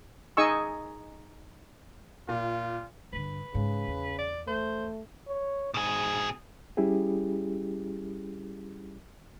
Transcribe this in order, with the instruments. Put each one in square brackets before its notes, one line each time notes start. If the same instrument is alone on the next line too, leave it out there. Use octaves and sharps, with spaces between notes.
[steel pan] D#4 G#4 D#5 G#5 C#6 E6
[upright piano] A#2 [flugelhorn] F4
[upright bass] G2 D3 [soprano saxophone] B4
[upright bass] G#2 [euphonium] C#3
[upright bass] E2
[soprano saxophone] D5
[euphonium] A3 [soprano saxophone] C5
[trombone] C#5
[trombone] G#2 [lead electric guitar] B2 G#4
[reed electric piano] G3 C#4 E4 G4 G#4